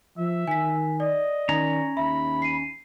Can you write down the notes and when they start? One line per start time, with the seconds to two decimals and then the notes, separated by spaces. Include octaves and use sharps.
0.17 F3 E5
0.47 D#3 G#5 B6
1.00 D5 D#5
1.49 D#3 C#4 A#5
1.97 D#2 E5 B5
2.42 C7 D#7